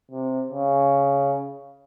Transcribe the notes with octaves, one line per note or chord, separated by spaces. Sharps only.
C3
C#3